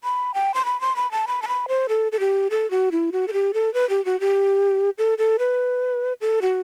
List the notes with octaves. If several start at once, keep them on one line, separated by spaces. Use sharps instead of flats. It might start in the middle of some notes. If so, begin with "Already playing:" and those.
B5
G5
C6
B5
C6
B5
A5
B5
A5
B5
C5
A4
A4
G4
A4
F#4
E4
F#4
A4
G4
A4
B4
G4
F#4
G4
A4
A4
B4
A4
F#4